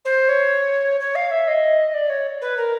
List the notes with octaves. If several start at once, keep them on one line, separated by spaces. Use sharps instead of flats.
C5
C#5
C#5
F5
E5
D#5
D5
C#5
B4
A#4